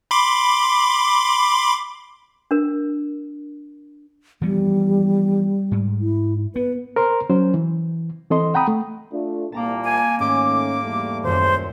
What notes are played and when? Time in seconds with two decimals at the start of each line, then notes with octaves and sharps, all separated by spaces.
0.11 B5 C6 D6
2.51 D4 A#4
4.42 E3 F3 G3 B3
5.72 G#2
6.00 E4
6.56 B3 B4
6.96 A#4 C5 A#5 C6
7.30 F#3 C#4 C5
7.54 E3
8.30 E3 C4 A4 D#5 C6
8.54 F#5 G5 A#5 B5 D#6
8.68 A3
9.13 A3 D4 F4
9.52 C2 A#2 A#3 A5 A#5 D6
9.84 G#5
10.20 G#2 D#3 A3 C#4 G#5 C6 D6
10.83 E2 G3 A3
11.23 D#1 F#2 C5